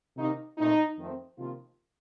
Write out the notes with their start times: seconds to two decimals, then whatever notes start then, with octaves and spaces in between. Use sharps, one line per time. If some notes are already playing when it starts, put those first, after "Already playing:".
0.17 C3 D#3 A#3 D#4
0.57 A#2 A3 C4 D#4
0.97 F2 D#3 A3 C4
1.37 C3 D#3 F3 A#3 F4